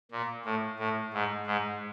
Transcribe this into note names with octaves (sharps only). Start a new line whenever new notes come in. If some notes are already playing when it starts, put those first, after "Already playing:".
A#2
A2
A2
G#2
G#2